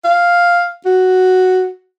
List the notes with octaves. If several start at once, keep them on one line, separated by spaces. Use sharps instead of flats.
F5
F#4